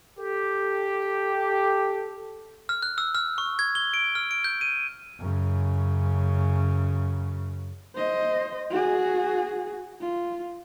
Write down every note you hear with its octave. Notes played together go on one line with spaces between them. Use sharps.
G4 A4
F6
F#6
E6
F6
C#6
G#6
G7
D7
F6
D7
G6
D#7
F#2 C#3
C5 D#5
F#4 G#4
F4